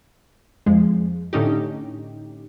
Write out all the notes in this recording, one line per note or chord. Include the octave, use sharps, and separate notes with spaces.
F2 F3 G#3
A2 D3 C#4 D#4 G4